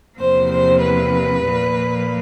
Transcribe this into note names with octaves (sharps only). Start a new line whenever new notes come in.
E2 C3 F3 A#3 C5
C5
B4
A#2 F3 A#3